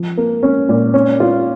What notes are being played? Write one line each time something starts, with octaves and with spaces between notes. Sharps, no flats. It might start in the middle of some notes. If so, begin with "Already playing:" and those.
Already playing: F3
A#3
C#4
A#2
C#4
F4